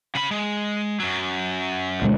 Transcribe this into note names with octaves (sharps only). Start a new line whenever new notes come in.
C#3 B5
G#3
F#2 F#3
D2 B2 G#3